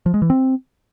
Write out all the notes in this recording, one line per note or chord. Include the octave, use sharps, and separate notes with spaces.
F3
G#3
E3
C4